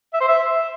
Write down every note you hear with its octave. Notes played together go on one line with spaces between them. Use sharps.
E5
C5
E5